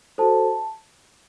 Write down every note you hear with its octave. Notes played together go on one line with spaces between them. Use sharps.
F#4 A4 C5 A5